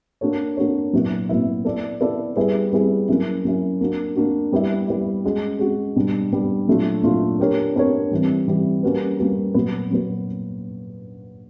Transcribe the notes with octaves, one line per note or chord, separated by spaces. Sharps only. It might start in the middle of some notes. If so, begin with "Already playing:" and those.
A#3 D4 F#4 A4 C#5
A#3 D4 F#4 A4 C#5
A#2 F#3 B3 E4
A#2 F#3 B3 E4
B3 E4 A4 D5
B3 E4 A4 D5
G3 B3 E4 G#4 B4
G3 B3 E4 G#4 B4
F#3 A#3 C#4 E4
F#3 A#3 C#4 E4
A#3 D4 F#4
A#3 D4 F#4
G3 B3 E4
G3 B3 E4
G#3 C#4 F#4
G#3 C#4 F#4
B2 G3 B3 D4
B2 G3 B3 D4
A#2 F#3 A3 D4 F4
A#2 F#3 A3 D4 F4
B3 D4 G4 A#4 C#5
B3 D4 G4 A#4 C#5
C3 E3 G3
C3 E3 G3
G3 A#3 C#4 F#4 B4
G3 A#3 C#4 F#4 B4
A#2 F#3 B3
A#2 F#3 B3